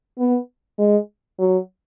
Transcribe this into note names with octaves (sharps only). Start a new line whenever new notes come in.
B3
G#3
F#3